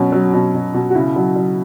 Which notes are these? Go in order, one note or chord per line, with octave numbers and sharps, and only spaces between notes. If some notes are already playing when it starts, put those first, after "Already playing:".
Already playing: B2 F#3 C#4
F#3
B2
B2
B2
F#4
C#3 E4
F#3
F#3